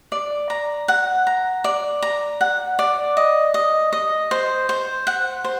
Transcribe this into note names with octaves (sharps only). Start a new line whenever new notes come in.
D5
A#5
F#5
A#5
D5
A#5
F#5
D5
D#5
D#5
D#5
C5
C5
F#5
C5